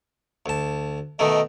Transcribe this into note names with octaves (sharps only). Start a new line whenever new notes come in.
D2 A5
B2 D#3 A3 D#5